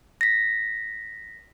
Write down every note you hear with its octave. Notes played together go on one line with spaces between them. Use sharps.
A#6 B6